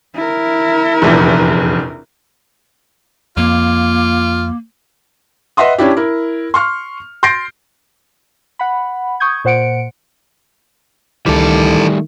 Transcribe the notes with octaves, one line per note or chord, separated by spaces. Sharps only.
E4 A#4
F1 A#1 E2
F2 A#3 F4
B4 D#5 E5 F#5 C6 D#6
C#4 D4 E4 G4
E4 A#4
C6 C#6 F6
C6 G6 A6 A#6 C7 D7
F#5 B5
C#6 D#6 G6 G#6
A#2 C5 F#5 C#7 D7
C#2 D#3 E3 G3 A3 A4 D6